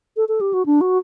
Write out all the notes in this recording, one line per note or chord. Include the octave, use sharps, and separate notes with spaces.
A4
A4
G4
F#4
D4
F#4